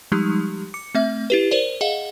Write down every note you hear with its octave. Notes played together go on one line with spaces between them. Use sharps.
F3 G3 G#3 D#4 G4
D6 C#7
A3 C4 E5
E4 G4 B4
A#4 C5 D5
G#4 D#5 F5 F#5